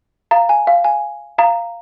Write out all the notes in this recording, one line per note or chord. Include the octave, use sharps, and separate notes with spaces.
F5 A#5
G#5
F5
G#5
F5 A#5